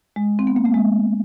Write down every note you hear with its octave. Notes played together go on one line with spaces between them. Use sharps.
G#3
C4
B3
A#3
A3
G#3